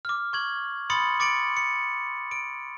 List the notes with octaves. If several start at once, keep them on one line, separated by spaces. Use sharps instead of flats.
D6 F6
C#6 G#6 F#7
B5 C6 D#6 A6 C#7 F#7
D6 A6 C#7 D7 F#7
C#7
D7